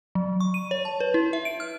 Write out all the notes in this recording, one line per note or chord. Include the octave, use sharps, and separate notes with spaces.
F#3
C#6
D#7
C#5
A5
B4
E4
E5
D7
F6